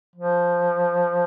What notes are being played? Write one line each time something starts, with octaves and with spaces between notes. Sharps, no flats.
F3